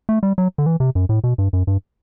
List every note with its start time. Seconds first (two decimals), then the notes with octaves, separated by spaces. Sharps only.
0.09 A3
0.23 G3
0.38 F#3
0.58 D3
0.66 E3
0.80 C3
0.95 F#2
1.09 A2
1.24 B2
1.38 G2
1.53 F#2
1.67 G2